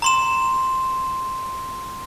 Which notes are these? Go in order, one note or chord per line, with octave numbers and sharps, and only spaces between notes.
A#5 C6 E7